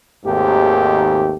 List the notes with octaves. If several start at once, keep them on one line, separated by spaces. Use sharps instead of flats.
G#1 D#2 G#2 A3 G4